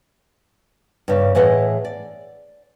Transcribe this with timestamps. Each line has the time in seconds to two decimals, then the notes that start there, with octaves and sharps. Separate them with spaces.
1.08 G2 C#3
1.35 A2 E3 G#4 D#5 F#5
1.85 D5